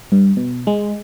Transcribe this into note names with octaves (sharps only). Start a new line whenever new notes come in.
G2
B2
G#3